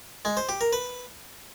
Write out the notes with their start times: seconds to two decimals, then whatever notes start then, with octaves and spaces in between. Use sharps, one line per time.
0.25 G#3
0.37 C5
0.49 G4
0.61 A#4
0.73 B4